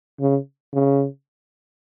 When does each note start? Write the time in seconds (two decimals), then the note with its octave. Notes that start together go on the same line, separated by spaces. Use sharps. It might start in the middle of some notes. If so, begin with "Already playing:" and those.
0.20 C#3
0.73 C#3